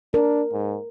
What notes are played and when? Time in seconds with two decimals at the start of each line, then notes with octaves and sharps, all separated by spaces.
0.14 D4 A#4
0.52 G#2